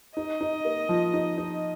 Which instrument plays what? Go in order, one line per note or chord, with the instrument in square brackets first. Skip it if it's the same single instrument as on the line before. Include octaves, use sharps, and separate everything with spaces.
[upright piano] D#4 [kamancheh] D#5
[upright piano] D#4
A#3
F3
D#4
D#4